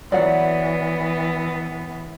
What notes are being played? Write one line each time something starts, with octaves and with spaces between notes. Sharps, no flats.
E3 F#3 B3 D5 F#5